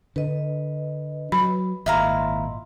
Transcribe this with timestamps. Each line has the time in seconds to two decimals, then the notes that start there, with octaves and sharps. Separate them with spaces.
0.16 D3 B4 D#5
1.32 F#3 B5
1.86 G#1 A#2 E4 D#5 F5 A#5 C6